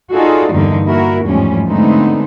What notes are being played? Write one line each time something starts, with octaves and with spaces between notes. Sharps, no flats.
D#4 F4 F#4 G#4 A4 D5
E2 G2 D3 A#3 D#4
A#3 E4 F#4 A#4
E2 G#2 F3 G3 A3 C#4
D3 G#3 A3 B3 C4 D#4